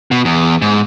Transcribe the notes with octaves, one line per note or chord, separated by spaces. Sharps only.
B2
E2
G#2